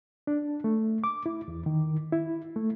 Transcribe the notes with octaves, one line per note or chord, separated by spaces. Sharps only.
D4
A3
D6
E4
E2
D#3
E4
A3